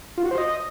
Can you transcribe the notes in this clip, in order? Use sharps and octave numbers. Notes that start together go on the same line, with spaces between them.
F4
F#4
C5
D#5